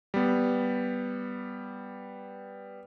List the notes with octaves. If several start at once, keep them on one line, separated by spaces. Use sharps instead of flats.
G3 B3